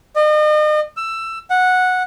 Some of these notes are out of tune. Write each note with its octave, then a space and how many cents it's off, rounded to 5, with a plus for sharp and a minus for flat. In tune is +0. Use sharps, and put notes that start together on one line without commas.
D#5 -40
E6 +15
F#5 -10